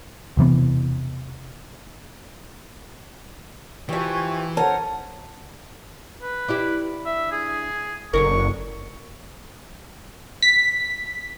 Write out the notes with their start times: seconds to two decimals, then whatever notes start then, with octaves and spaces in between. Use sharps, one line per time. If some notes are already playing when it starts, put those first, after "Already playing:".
0.37 E1 C3 E3 B3
3.89 E3 F3 G4 G#5 C#6
4.57 C#4 A4 A#4 C5 F#5 A5
6.22 B4
6.48 D4 E4 G4
7.06 E5
7.32 G#4
8.13 F#1 D3 F#3 A#4 C#6
10.42 B6